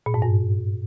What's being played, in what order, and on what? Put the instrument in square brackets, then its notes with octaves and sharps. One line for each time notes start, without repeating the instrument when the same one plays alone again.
[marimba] A#2
G#2
G2